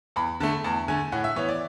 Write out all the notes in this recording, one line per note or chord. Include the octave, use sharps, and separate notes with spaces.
E2 B5
D3 A3 A5
E2 A5
D3 A3 G#5
A2 F#5
E5
E3 B3 C#5
D5